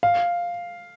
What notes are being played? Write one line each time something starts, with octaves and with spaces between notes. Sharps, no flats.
F5